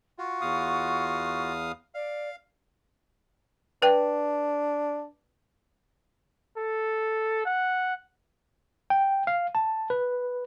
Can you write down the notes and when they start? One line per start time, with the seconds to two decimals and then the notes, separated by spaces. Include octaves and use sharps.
0.18 F4 F#4 C#6
0.41 E2 F5 D#6
1.94 D5 F5
3.82 D4 B4 G5
6.57 A4
7.45 F#5
8.90 G5
9.27 F5
9.55 A5
9.90 B4